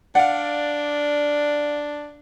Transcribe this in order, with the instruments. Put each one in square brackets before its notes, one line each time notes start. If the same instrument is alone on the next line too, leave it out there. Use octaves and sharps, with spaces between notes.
[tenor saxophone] D4 [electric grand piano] D5 F5 [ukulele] F#5